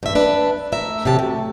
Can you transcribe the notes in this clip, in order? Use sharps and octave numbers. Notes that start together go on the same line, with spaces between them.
G2 E5
D4 B4
A3 A#4 E5
C3 F#3 G4 A5
A3